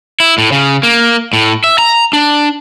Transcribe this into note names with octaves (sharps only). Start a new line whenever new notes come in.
E4
A2
C#3
A#3
A2
E5
A#5
D4